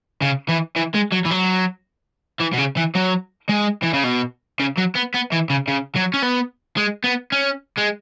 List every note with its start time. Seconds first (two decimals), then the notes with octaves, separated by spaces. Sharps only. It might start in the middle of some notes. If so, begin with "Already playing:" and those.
0.22 C#3
0.49 E3
0.76 E3
0.95 G#3
1.12 F#3
1.25 E3
1.31 F#3
2.41 E3
2.53 B2
2.58 C#3
2.77 E3
2.95 F#3
3.49 G#3
3.83 E3
3.94 C#3
4.04 B2
4.59 C#3
4.77 F#3
4.95 B3
5.14 B3
5.32 E3
5.50 C#3
5.68 C#3
5.96 F#3
6.14 C#4
6.23 B3
6.77 G#3
7.04 B3
7.32 C#4
7.77 G#3